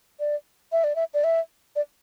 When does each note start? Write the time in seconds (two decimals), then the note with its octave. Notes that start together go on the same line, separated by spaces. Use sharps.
0.20 D5
0.72 E5
0.84 D5
0.96 E5
1.14 D5
1.24 E5
1.76 D5